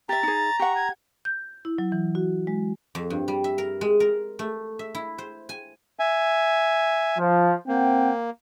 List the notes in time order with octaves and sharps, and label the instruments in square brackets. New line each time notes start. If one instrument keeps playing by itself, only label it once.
[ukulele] G4 E5 [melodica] A#5 [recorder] A6
[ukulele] D#4 G#4
[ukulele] G4 F#5 [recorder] C#6
[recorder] G#6
[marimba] G6
E4
F#3
E3
F#4
G#3
[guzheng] F2
G2
G3
E5
A#4
G#3
A#4
A3
E5
E4
C5
G#5
[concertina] E5 G#5
[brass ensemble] F3
[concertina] A#3 [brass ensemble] C4 F#5 G5